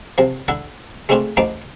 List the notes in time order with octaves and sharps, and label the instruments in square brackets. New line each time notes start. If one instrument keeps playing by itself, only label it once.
[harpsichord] C3 F3
D3 E4 A4 F#5
G#3 A3 C4 D4 E4 F4
A1 F3 D#4 A5 A#5 D6